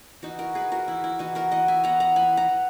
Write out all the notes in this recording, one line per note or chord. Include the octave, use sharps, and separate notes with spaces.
E3 D#4 F#4
F#4 A#4
E3 G#4 B4
F#4 A#4
E3 E4
E4
E3 D#4 F#4
F#4 A#4
E3 D#5 F#5
E5 G#5
B3 F#5 A#5
F#5 A#5
E3 G#5 B5
F#5 A#5
E3